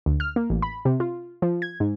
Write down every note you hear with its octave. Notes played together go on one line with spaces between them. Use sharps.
D2
F6
A#3
A1
B5
C3
F4
F3
G#6
G#2